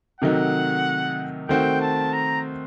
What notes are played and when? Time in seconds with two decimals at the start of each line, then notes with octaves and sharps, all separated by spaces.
0.20 C3 D#3 F#3 A3 D#4 F#5
1.49 D#3 A3 C4 F#4 G5
1.81 A5
2.13 A#5